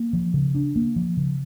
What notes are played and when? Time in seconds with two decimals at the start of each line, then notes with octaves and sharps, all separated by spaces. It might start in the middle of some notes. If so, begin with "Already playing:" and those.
Already playing: A#3
0.13 F3
0.34 C#3
0.55 D4
0.76 A#3
0.96 F3
1.17 C#3